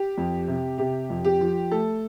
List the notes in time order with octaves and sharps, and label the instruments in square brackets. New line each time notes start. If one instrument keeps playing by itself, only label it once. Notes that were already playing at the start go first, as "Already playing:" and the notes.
Already playing: [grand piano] G4
F2
C3
C3 G4
F2
G4
F3
A3 A4